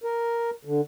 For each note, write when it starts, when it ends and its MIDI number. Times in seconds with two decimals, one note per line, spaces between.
0.04 0.50 70
0.65 0.81 50